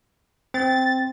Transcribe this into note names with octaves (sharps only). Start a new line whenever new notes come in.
C4 A6